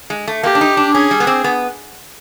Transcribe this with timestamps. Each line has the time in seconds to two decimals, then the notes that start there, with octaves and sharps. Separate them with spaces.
0.10 G#3
0.28 A3
0.43 A#3 G4
0.55 D4
0.61 D#4
0.77 D4
0.94 C#4 G#4
1.11 G3
1.20 B3
1.27 C4
1.44 B3